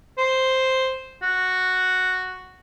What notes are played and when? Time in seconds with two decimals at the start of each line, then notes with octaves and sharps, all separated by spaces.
0.18 C5
1.22 F#4